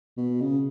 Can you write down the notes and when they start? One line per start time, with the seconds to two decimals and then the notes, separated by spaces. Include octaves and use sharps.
0.17 B2
0.41 C#3